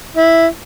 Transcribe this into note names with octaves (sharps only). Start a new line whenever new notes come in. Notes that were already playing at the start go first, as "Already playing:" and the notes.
E4